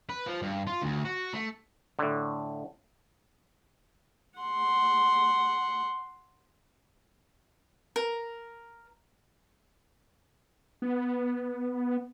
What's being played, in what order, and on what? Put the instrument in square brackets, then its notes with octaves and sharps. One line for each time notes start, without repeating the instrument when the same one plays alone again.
[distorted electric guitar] B4
F3
G2
F4
D2
F#4
A3
[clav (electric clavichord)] A2 D3
[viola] F#5 C6
[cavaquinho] A#4
[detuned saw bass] B3